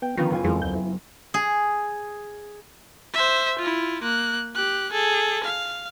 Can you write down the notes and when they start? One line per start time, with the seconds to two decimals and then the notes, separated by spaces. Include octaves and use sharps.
0.02 B3 G5
0.17 D3 D#3 F3 B3 C#4 F4
0.30 F#1 F4 G#5
0.44 F2 E3 F#3 G#3 C4 A#4
0.62 D2 G6
0.75 E4
1.34 G#4
3.14 C5 E5
3.59 E4 F4
4.02 A#3 F#6
4.56 G4 F#6
4.92 G#4 A4
5.44 F5